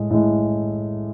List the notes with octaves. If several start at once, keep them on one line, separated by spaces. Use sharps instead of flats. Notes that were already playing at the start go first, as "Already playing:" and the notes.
Already playing: A2 G#3
A2 G#3